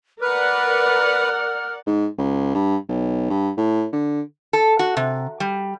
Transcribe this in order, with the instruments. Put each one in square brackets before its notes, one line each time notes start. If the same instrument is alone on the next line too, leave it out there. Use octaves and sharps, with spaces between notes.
[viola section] A#4 D5 F#5 [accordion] B4 [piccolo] F6
[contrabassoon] G#2
C#2
G2
B1
G2
A2
D3
[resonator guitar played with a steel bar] A4
F#4
C3
G3